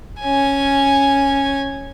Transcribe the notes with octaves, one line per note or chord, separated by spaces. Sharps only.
C#4 G#5